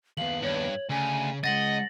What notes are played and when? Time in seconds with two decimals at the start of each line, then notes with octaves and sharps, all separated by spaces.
0.17 D#2 B3 F5 F#7
0.43 G2 C#5
0.90 D2 C#3 G#5
1.44 C#3 G#3 D#5 F#5 A6 A#6 F#7